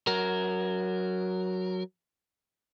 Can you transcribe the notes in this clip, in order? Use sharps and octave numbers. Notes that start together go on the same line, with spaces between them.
F#3 A#4